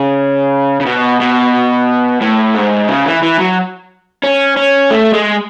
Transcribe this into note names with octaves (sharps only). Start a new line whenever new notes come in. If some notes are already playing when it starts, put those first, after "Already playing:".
Already playing: C#3
C#3
B2
B2
A2
G#2
C#3
E3
E3
F#3
C#4
C#4
A3
G#3